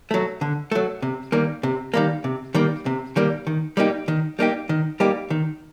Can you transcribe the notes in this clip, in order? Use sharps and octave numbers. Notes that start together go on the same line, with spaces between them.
F#3 A3
D3
F#3 A3
C3
D#3 G3 A#3
C3
D#3 G3 A#3
C3
D#3 G3 A#3
C3
D#3 G3 A#3
D#3
G3 A#3 D#4 G4
D#3
G3 A#3 D#4 G4
D#3
G3 A#3 D#4 G4
D#3